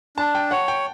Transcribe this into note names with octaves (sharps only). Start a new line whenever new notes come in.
D4 A5
G5
C#5 F#5
G5